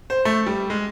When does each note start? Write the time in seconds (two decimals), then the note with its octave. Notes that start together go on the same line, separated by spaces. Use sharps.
0.10 C5
0.25 A3
0.46 G3
0.70 G#3